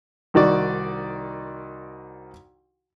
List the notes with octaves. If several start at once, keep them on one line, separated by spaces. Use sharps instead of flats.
C2 D#3 F#4 D5